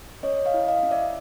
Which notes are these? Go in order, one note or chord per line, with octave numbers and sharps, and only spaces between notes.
C#4 C#5 D#5
D#5 F5
E4
D#5 F5
C#4
D5 E5